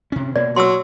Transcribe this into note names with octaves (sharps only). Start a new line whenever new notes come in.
C3 C#4
B2 A#3 D5
F#3 C6 E6